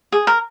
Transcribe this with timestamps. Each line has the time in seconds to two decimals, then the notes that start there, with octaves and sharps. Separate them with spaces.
0.12 G#4
0.27 A#4